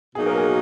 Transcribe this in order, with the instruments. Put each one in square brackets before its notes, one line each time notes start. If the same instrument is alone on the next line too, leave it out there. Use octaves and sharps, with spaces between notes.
[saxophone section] B2 F#3 A#3 D#4 [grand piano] G#4
[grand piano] A#4
G#4